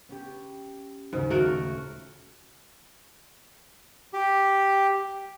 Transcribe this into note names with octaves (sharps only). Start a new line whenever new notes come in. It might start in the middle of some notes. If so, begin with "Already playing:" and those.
B3 C#4 G4
D#2 G#2 C#3 G#3
D#1 A3 F#4 A#4
G4